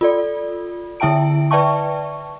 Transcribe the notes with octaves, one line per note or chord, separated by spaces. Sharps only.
F4 A4 D5
D3 E4 E5 G5 A5 D7
B4 D5 E5 G5 A5 C#6